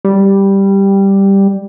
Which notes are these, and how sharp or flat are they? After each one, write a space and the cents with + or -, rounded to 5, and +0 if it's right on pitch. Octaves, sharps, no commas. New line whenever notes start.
G3 +0